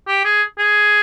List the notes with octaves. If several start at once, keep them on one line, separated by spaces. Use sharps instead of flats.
G4
G#4
G#4